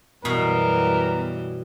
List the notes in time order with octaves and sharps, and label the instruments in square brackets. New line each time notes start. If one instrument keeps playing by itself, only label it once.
[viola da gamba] F#2 E3 G3 [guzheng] B2 [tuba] B3 [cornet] A#4